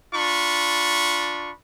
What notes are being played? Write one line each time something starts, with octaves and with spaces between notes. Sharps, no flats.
D4 F4 B5 C#6